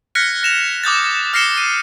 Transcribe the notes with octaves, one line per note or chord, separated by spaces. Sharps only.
F6 F#6 G#6 A#6 B6 C#7
A#6 E7 F7
D6 D#6 G6 A6
F6 A#6 C7 C#7 E7 G7
D#7